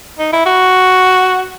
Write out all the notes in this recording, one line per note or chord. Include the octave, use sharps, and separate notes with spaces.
D#4
E4
F#4